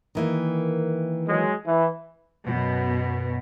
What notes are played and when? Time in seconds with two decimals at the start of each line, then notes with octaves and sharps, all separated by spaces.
0.15 D#3 E3 A#3
1.28 F#3 G#3
1.66 E3
2.45 F#2 B2